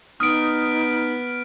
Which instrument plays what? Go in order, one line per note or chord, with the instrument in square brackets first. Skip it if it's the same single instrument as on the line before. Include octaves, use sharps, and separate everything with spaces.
[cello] B3 [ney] D#4 [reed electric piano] D#6 [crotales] F6 D7